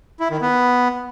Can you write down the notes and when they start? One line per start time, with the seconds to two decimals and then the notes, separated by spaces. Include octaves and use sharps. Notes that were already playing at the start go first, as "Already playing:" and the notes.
0.20 E4
0.31 D#3
0.41 B3